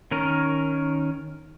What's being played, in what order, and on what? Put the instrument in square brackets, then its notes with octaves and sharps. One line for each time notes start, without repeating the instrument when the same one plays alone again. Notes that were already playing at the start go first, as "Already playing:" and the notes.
[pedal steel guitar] D#3 C#4 A#4